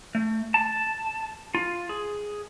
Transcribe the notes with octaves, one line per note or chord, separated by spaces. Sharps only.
A3
A5
F4
G#4